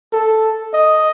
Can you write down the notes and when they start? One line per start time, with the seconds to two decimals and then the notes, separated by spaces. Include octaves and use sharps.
0.12 A4
0.73 D#5